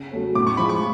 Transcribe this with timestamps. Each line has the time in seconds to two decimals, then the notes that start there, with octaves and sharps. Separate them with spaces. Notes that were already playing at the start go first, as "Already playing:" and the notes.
Already playing: C#3
0.12 F#3 A3 C#4
0.35 A2 D6
0.47 C#6
0.57 F3 G#3 B5
0.69 C#6